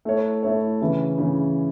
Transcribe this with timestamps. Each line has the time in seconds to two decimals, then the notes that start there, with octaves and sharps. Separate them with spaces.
0.05 A3 E4 C#5
0.43 A3 E4 C#5
0.81 C#3 E3 C#4 E4
1.18 C#3 E3 C#4 E4